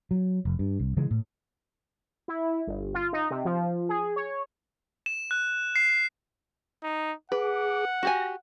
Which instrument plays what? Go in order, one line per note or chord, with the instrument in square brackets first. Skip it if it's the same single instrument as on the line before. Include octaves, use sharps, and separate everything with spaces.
[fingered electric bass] F#3
F1
G2
C2
C#3 E3 G#3
A2
[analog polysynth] E4
G1
F4
D#4
C3
F3
G#4
C#5
[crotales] E7
F#6
C7
[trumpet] D#4
[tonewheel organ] G#4 D6 [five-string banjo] B4 [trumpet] F#5
[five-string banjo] F#4 G4 G#5 [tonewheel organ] A#6